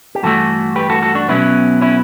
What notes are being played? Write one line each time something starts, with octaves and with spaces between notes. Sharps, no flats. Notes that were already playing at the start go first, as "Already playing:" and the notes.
G4
G2 E3 A3 F#4 A4
G4 B4
F#4 A4
F#4 A4
D4 F#4
B2 F#3 B3 C#4 E4
C#4 E4